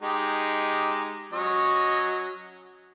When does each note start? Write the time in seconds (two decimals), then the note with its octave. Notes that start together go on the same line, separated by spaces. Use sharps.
0.02 G#3 D#4 G4
1.33 F#3 C#4 D#5